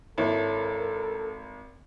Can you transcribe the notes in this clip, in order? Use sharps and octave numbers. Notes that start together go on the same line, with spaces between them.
G#1 E4 A4 A#4 C#5